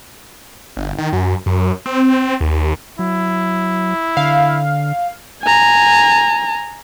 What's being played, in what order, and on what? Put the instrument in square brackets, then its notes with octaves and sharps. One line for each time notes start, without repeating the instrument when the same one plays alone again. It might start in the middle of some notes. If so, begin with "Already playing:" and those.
[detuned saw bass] G1
D#3
F#2
F#2
C4
D#2
[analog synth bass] F#3 [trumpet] E4
[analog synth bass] D3 [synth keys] F5
[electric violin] G#5 A#5